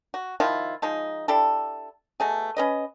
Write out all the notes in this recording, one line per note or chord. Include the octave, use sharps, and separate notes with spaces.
F#4
D#3 F3 E4 F4
F3 G#3 D#4
D4 E4 G4 A4
B2 A3 G#4
C#4 B4 D#5